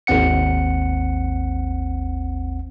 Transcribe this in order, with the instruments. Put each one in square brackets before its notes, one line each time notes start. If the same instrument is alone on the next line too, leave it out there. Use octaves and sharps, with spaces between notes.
[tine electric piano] G#1 D#2 C4 F#5 C#7